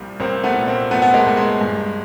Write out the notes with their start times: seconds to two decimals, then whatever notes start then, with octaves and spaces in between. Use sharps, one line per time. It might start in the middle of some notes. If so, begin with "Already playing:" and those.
Already playing: C2 A#2 F3 G3
0.20 C2 A#3 C4
0.44 A3 B3
0.55 A#2
0.68 A#3 C4
0.90 F3 A3 B3
1.02 B3
1.14 G#3 A#3
1.26 C2 A3
1.37 G#3
1.61 G2